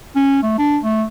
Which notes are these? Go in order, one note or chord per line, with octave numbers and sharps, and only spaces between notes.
C#4
A3
D4
A3